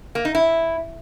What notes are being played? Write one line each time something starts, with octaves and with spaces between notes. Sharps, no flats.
A#3
D#4
E4